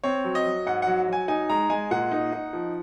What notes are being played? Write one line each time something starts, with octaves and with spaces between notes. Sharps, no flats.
C4 C#5
F#3
D#5
F#3
G#2 F#5
F#3 F#5
F#3 G#5
D#4 G#5
G#3 A#5
G#3 G#5
A#2 F#5
D#4
D#4
F3